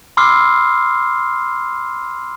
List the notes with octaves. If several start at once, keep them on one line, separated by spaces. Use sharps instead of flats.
B5 C6 D6 E6 F6 C7